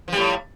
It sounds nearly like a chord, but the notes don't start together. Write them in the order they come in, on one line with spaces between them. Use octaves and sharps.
F3 G3 A2